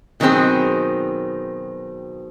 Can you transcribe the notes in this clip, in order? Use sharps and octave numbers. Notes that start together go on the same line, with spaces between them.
B2 D#3 F#3 G#3 C4 G#4